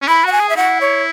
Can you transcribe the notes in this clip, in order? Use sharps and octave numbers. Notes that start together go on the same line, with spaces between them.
C#4
E4 B5
F#4 F#5
G#5
G#4
E5
E4 F#5
C#5